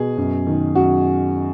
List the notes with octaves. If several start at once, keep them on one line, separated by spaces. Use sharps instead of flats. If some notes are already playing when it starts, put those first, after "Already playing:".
Already playing: B2 G#4
F#2
D#3
F#2 F#4